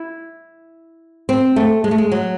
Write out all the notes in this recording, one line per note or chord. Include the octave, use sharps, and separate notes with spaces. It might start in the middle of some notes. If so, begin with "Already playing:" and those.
Already playing: E4
C4
A3
G#3
A3
G#3
F#3